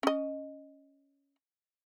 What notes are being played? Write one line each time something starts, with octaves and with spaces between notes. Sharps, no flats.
C#4 D#5